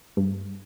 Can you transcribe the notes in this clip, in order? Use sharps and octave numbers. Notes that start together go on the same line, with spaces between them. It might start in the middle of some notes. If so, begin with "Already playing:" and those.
G2